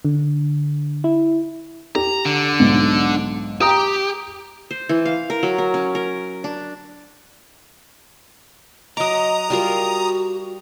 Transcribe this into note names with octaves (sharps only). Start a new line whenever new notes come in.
D3
E4
G4 A#5
D3
B1 G#2
G4 G5 A#5 D#6
C5
E3
F5
A#4
F#3
A#4
C#4
A#4
D4
F#3 D#5 A#5 D6 D#6
G3 F4 F#4 A#4